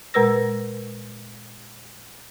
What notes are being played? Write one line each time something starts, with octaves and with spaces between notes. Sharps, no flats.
A#2 G#3 A#4 B4 E6 A#6